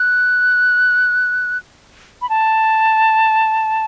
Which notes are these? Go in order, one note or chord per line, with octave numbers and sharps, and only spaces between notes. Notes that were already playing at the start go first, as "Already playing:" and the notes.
Already playing: F#6
B5
A5